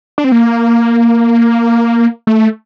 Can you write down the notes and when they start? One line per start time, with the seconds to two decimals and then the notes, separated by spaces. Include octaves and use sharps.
0.18 D4
0.24 C4
0.32 A#3
2.27 A3